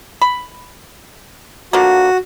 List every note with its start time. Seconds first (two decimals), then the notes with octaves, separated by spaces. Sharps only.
0.22 B5
1.73 D3 F3 A#3 F#4